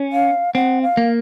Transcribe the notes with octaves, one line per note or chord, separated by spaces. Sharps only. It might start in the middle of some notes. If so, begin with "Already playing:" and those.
Already playing: C#4
F5
C4 F#5
F5
A#3